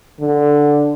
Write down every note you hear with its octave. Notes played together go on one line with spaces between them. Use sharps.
D3